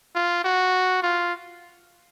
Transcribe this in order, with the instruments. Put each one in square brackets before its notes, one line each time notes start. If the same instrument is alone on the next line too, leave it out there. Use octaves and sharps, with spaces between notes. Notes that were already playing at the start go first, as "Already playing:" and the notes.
[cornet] F4
F#4
F4